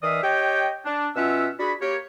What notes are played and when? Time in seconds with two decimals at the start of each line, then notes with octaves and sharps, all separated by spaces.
0.03 D#3 E3 D5 E5 F5 D#6
0.23 G4 C#5 D#5 G5
0.85 D4
1.16 B2 C#4 F4 E5 F#5 E6
1.60 D4 F#4 G#4 B5
1.81 A#3 G4 A#4 C#5